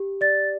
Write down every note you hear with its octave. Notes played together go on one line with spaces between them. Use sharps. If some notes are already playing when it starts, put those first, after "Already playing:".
Already playing: G4
D5 A6